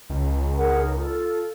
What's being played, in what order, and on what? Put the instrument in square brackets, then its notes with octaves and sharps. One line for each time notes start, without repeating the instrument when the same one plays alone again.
[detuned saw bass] C#2
[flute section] G#4 A#4 F#5
D#4
F4 A4